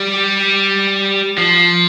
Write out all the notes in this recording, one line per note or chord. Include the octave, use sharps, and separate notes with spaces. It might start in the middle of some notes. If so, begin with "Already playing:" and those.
Already playing: G3
F3